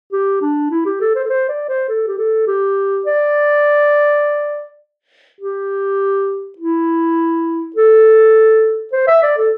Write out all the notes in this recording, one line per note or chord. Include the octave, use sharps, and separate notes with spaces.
G4
D4
E4
G4
A4
C5
A4
C5
D5
C5
A4
G4
A4
G4
D5
G4
E4
A4
C5
E5
D5
A4